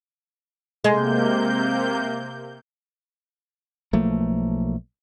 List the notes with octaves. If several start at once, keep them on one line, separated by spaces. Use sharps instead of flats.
C3 G#3 A#3 G6
B1 F3 A3 A#3